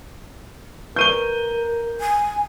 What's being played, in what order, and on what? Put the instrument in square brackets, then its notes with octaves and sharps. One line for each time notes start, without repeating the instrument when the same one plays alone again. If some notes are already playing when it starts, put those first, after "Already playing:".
[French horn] A#4 [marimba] B4 C#6 [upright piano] G6 D#7 G7
[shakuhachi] G#5